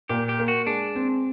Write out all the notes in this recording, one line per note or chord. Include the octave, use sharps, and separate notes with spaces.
A#2 G4
G4
A#3
F#4
G#3 D4
C4